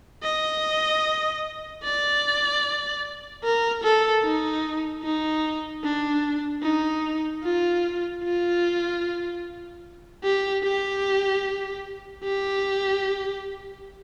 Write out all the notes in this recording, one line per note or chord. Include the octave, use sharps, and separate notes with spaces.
D#5
D5
A#4
A4
D#4
D#4
D4
D#4
F4
F4
G4
G4
G4